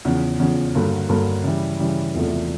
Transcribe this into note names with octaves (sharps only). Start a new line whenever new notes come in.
E2 C#3 F3
E2 C#3 F3
G2 D3 F#3 A#3
G2 D3 F#3 A#3
C#3 E3 G3
C#3 E3 G3
E1 E2 C3 F3 A3